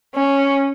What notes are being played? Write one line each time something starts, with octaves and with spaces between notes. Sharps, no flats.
C#4